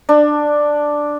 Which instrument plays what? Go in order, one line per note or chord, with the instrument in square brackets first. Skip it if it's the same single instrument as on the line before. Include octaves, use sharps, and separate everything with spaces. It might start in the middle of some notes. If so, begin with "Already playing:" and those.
[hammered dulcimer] D4